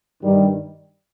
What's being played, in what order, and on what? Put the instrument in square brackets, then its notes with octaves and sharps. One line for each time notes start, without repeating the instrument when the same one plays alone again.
[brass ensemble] G2 D#3 G3